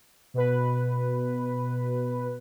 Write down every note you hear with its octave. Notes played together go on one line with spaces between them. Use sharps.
B2 B4